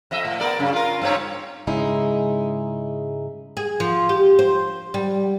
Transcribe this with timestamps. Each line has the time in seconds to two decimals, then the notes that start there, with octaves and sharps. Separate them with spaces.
0.11 F2 D#5 E5
0.25 A2
0.40 B3 A#4 D5
0.59 F#2 C#3 C#4
0.73 F4 A#4
1.01 G2 C4 C#5
1.67 G#2 C#3 G#3 D#4 E4
3.57 G#4
3.80 F3
4.09 G4
4.39 C5
4.94 G3